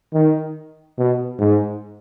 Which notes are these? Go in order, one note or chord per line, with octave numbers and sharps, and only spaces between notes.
D#3
B2
G#2